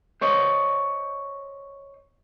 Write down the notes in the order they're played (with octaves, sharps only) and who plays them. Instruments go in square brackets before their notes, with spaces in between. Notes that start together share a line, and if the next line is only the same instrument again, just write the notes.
[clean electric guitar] C5 C#5 D#5